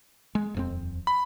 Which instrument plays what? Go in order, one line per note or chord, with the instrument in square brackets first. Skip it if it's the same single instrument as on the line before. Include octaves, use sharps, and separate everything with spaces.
[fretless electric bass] G#3
D#1 F2 C4
[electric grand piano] B5